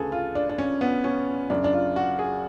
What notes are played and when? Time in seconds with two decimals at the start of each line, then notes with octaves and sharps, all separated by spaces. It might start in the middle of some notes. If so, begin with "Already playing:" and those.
Already playing: D2 C#3 G#4 A4 B4
0.12 F4
0.35 D4
0.49 D4
0.58 C#4
0.81 B3
1.04 C#4
1.50 F#2 C#3 D4
1.64 D4
1.73 F4
1.96 F#4
2.19 G#4